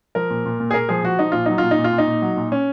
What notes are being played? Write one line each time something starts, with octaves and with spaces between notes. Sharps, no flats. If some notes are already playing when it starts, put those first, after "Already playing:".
F3 A#4
A#2
A#2
A#2
G#4
A#2 A#4
F3 G#4
F3 F#4
F3 D#4
A#2 F4
F#3 D#4
A#2 F4
D#4
A#2
F4
A#2
D#4
A#2
F#3
A#2
C#4